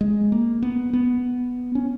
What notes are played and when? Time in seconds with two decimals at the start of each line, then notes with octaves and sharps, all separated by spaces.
0.01 G#3
0.32 A#3
0.62 B3
0.93 B3
1.75 C#4